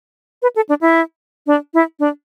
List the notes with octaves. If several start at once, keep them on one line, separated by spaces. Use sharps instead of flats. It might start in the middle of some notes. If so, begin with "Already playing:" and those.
B4
A4
D4
E4
D4
E4
D4